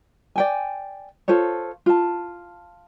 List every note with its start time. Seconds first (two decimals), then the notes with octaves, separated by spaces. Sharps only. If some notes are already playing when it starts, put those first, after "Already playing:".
0.36 D5 G5 G#5
1.28 F4 A4 C5 C#5
1.86 F4 A5